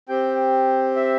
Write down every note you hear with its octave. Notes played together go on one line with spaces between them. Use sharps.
C4 G4 G5
E5